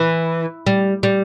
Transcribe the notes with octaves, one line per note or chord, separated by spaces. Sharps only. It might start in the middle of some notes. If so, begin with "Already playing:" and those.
Already playing: E3
G3
G3